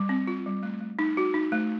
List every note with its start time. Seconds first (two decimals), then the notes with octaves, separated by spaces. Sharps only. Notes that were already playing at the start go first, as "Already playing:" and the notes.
Already playing: G3
0.09 C4
0.27 F4
0.46 G3
0.63 A3
0.81 A3
0.99 D#4
1.17 F#4
1.34 D#4
1.52 A3